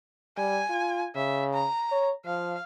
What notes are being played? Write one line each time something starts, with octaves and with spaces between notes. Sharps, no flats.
G3 G#5
F4
C#3 E5
A#5
C#5
F3 F5